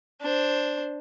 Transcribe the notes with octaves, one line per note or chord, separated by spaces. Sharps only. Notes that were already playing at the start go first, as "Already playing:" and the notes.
D4 C5